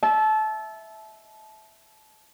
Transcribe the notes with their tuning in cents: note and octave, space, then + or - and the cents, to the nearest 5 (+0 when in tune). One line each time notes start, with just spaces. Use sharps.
E5 +0 A5 -25